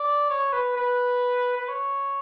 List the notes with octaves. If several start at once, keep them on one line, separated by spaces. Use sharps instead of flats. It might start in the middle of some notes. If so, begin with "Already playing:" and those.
Already playing: D5
C#5
B4
B4
B4
C#5